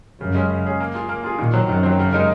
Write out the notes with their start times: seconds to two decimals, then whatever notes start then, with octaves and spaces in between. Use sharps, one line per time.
0.20 F#2 C#3
0.35 G#3 C#4 G#4
0.50 C#3
0.65 G#3 C#4 G#4
0.80 A#3
0.94 F4 G#4
1.09 A#3
1.24 F4 G#4
1.39 A#2 D#3
1.54 F#3 C4
1.68 F#2 D#3
1.83 F#3 C4
1.99 C#3
2.13 G#3 D#4 A#4